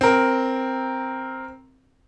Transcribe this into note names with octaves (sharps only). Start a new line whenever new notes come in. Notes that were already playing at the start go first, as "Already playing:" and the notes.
C4 A#4